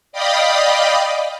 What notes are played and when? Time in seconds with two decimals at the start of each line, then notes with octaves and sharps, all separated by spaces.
0.12 D5 D#5 F5 G5 B5 D#6